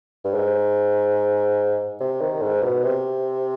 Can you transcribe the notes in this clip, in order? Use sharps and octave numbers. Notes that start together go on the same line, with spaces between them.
G2
G#2
C3
D#3
G#2
B2
C3